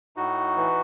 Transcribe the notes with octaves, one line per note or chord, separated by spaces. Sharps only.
A2 D#4 F#4
E3